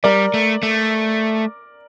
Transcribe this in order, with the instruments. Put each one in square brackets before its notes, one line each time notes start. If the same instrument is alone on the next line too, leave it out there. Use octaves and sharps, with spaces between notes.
[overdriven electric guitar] G3 [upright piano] A#4 D5
[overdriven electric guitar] A3
A3